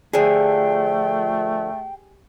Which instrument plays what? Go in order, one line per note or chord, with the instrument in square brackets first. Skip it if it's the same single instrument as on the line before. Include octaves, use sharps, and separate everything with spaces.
[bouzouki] D3 F3 [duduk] A3 [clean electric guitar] G4 G#4 [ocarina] G5